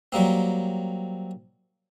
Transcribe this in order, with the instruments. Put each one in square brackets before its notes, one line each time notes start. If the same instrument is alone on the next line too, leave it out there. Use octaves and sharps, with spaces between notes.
[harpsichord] F#3 G3 A#3 C4